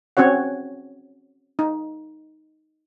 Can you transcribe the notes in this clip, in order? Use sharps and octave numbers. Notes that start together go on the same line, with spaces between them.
C4 C#4 F#4 C#5 F#5
D#4